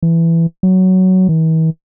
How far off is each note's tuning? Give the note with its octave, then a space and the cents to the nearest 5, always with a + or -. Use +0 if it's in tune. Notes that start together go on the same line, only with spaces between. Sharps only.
E3 +10
F#3 +10
E3 -45